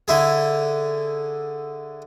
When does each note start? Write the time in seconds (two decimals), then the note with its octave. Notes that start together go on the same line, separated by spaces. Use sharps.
0.08 D3 E4 G#4